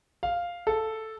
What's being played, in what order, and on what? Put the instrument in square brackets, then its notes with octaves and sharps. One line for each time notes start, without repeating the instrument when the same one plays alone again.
[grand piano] F5
A4